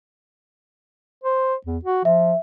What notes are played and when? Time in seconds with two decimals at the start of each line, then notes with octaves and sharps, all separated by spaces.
1.24 C5
1.66 E2
1.85 F#4
2.05 F3 E5